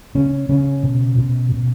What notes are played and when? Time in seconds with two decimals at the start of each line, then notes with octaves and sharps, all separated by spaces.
0.15 C#3 C#4
0.49 C#3 C#4
0.83 B2
1.18 B2
1.52 B2